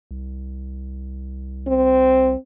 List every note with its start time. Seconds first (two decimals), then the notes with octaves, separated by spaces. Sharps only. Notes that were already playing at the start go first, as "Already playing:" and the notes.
0.11 C2
1.68 C4